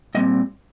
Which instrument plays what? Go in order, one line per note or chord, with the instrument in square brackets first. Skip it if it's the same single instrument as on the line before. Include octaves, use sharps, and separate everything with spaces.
[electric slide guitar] A#2 G3 C4 D#5